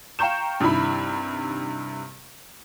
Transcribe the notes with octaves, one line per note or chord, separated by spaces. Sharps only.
F5 G5 A#5 C#6 G6 E7
G2 C3 D#3 E4 B5